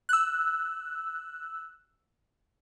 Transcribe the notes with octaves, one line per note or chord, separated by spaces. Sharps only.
E6 F#6